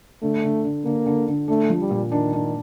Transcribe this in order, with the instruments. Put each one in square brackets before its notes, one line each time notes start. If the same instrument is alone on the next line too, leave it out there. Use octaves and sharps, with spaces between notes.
[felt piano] D3 [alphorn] A3
[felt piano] D3
D3
[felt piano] D3 [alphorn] A#3
[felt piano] D3
D3
[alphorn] A3 [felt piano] D4
[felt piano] F3
[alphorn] G3
[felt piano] A#2
[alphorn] D#3 [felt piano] D4
[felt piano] D4